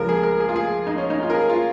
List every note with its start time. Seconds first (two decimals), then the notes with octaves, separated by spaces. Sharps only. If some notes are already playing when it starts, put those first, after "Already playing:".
Already playing: C#2 C#3 F3 A#4
0.09 G#4
0.23 A#4
0.40 G#4
0.49 F4
0.56 G#4
0.87 D#4
0.98 C#4
1.10 D#4
1.23 F4
1.30 A#4
1.35 G#4
1.49 F4